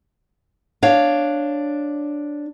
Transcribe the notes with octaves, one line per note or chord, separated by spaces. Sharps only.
D4 C#5 F5